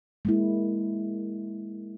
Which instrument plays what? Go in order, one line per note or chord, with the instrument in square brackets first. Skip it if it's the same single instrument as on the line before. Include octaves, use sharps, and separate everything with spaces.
[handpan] G#3 A#3 E4